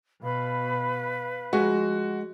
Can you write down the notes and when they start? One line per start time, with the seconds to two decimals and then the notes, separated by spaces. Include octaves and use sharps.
0.22 B2 B4 F5 B5
1.53 F3 G#3 F#4